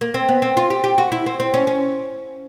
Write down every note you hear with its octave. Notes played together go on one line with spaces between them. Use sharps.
A#3
C4
B3
C4
F4
G4
G4
F#4
E4
C4
C4
C#4
C#4